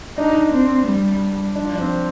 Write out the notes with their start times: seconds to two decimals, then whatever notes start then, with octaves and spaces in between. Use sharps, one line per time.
0.17 D4 D#4
0.52 C4
0.86 G3
1.55 F3 D4
1.75 D4
1.79 C4